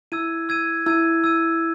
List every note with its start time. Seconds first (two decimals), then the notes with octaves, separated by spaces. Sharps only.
0.12 E4 E6 G#6 D#7
0.49 E6 G#6 D#7
0.86 E4 E6 G#6 D#7
1.24 E6 G#6 D#7